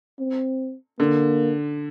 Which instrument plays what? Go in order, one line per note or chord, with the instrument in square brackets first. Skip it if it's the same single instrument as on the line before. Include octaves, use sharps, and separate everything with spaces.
[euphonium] C4
[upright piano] D3 [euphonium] A#3